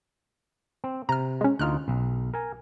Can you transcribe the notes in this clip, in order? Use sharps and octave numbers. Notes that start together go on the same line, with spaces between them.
C4
C3 A#5 F6
G#3 C#4
D2 D#4 F4 F6 F#6
B1
A#4 G#5